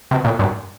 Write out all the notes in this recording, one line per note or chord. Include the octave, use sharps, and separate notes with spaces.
C3
A#2
G2